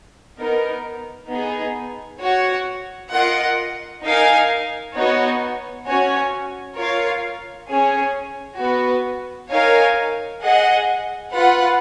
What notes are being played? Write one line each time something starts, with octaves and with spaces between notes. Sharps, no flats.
B3 D#4 A#4
B3 D#4 G#4
F#4 C#5 F#5
F4 A#4 D#5 F#5
D#4 A#4 F5 G#5
B3 D#4 F#4 C#5
C#4 F#4 C#5 G#5
F4 A#4 C#5 F5
C#4 G#4 C#5 G#5
B3 F#4 B4
D#4 A#4 C#5 F5 G#5
G#4 D#5 F#5
F4 B4 F#5